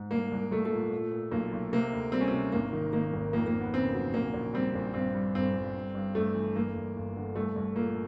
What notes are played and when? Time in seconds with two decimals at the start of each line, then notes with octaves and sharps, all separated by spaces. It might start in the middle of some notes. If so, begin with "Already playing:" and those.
Already playing: G#2
0.11 C2 A#3
0.31 C2
0.51 C2 A3
0.66 A3
0.72 A#2
0.92 A#2
1.12 A#2
1.31 B1 A#3
1.53 B1
1.73 C3 A#3
1.93 D2
2.12 G3 C4
2.21 C#4
2.28 C3 C4
2.52 G#1 A#3
2.73 D#3
2.93 D#3 A#3
3.14 G#1
3.33 F2 A#3
3.46 A#3
3.54 F2
3.60 B3
3.73 C#3 C4
3.94 F#3
4.14 A#1 A#3
4.34 A#1
4.54 G3 C4
4.75 A#1
4.94 G2 C4
5.14 G3
5.35 G1 C4
5.55 G1
5.75 G2
5.95 G2
6.15 G2 A3
6.35 E3
6.55 G1 A#3
6.75 G1
6.96 G1
7.16 D3
7.35 C2 A3
7.56 C2
7.76 A#2 A#3